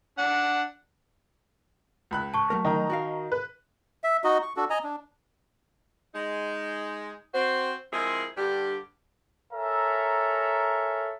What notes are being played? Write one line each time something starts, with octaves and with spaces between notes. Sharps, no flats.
D4 F#5
C#2 B5 F#6
A5 C#6
F#3 A3 A#4
D#3 D#5 A#5
F#4 A#4 F5
B4
E5
D#4 F#4 D#5
C#6
D4 F#4 A4
D#5 G#5 A#5
D4
G#3 D#4
C4 F#4 C5
F3 G#3 C4 E4 G#4 A#4
G2 D3 G3 G4
A4 A#4 C#5 E5 G#5 A#5